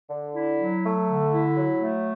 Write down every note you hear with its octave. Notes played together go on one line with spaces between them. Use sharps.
D3
E4
F#3
A3
D3
E4
F#3
A3